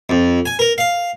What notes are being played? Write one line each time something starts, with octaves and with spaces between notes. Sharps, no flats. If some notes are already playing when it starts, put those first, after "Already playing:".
F2
G#5
A#4
F5